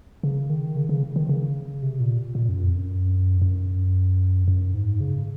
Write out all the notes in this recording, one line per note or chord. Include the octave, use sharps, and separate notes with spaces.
C#3
D#3
C#3
C#3
D#3
C#3
C3
A#2
A#2
F#2
F2
F#2
F#2
F#2
G#2
C#3